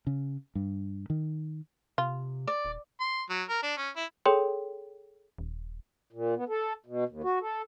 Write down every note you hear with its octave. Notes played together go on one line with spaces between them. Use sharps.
C#3
G2
D#3
C3 F4
D5
D#1
C6
F#3
A#4
D4
C#4
E4
G#4 A4 C#5 G5 C6
D#1
A#2
B3
A4
B2
D#2
F#4
A4